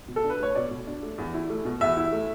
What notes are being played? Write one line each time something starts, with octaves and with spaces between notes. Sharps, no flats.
B2
A4
D4
B4
A3 C#5
B2 D5
B2
D4
A3
E2
E4
A3
B2
E2 E5
E4
A3